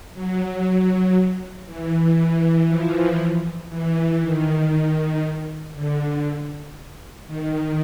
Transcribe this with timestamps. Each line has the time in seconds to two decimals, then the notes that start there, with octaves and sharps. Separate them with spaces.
0.14 F#3
1.66 E3
2.18 E3
2.68 F3
3.70 E3
4.21 D#3
5.75 D3
7.27 D#3